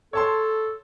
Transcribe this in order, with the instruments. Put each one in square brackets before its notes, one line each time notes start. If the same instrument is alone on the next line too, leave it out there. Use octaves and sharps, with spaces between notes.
[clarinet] A4 [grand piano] C#5 A5 C6